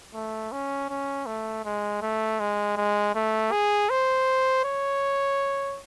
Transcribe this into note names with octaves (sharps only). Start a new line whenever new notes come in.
A3
C#4
C#4
A3
G#3
A3
G#3
G#3
A3
G#4
C5
C#5